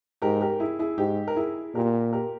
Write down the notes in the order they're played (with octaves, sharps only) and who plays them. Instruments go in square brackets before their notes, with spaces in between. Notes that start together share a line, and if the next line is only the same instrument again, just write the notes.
[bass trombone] G#2 [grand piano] G4 A#4
[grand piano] G4 A#4
E4 G#4
E4 G#4
[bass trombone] G#2 [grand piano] D#4 G4
[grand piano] A#4
E4 G#4
[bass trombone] A#2 [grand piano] G4 A#4
[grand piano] G4 A#4